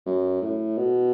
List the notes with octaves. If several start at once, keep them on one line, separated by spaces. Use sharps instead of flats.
F#2
A2
B2